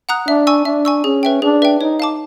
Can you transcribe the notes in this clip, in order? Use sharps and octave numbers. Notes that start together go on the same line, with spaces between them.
F#5 A#5 D#6 F#6
D4 E5
G#5 C#6 E6
D4 E5
G#5 C#6 E6
C#4 G#4
B4 E5 G5
D4 G#4
B4 E5 G5
D#4 C#5
F5 A5 D6